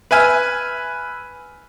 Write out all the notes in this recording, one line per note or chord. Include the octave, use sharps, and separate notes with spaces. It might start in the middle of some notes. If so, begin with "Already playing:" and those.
B4 E5 G#5 F6